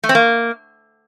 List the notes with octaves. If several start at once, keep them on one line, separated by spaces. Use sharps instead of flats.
A3
C4
A#3